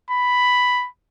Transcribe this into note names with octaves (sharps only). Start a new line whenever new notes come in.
B5